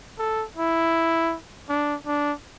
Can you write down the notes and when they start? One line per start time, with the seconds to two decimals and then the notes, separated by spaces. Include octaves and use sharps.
0.19 A4
0.57 E4
1.69 D4
2.06 D4